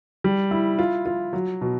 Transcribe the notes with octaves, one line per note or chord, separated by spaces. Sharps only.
G3
E4
F4
F4
F#3
B2